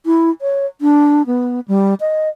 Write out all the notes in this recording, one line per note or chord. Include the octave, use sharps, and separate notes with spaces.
E4
C#5
D4
B3
G3
D#5